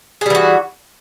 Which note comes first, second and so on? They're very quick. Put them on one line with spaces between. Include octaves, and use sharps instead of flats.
G#4 G3 E3 F#4